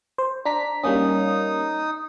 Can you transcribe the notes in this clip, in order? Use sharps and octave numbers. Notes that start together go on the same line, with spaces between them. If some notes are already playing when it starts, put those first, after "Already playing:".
C5
D4 A#5 B6
G3 A#3 C#4 D#4 D#6